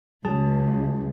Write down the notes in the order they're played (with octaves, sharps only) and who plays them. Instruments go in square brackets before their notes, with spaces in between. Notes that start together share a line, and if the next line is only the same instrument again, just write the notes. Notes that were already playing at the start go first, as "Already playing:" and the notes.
[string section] C#2 [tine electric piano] F#3 G#4 A5